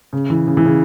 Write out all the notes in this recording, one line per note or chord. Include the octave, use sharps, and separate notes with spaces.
C#3
E3
C#3
E3
C#3